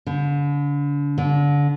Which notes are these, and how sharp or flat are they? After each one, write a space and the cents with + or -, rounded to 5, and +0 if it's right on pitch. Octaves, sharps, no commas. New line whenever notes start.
D3 -35
D3 -30